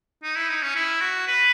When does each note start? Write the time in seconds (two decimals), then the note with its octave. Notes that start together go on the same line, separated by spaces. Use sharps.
0.23 D#4
0.36 E4
0.49 D#4
0.62 C#4
0.75 E4
1.01 F#4
1.27 B4